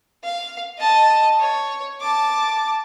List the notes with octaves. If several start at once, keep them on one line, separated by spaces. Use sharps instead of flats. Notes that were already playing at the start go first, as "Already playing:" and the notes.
F5
D#5 A5
C#5
A5 D6